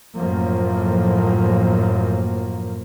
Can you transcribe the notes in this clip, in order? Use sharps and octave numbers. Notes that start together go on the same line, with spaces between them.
F#2 A2 F3 A#3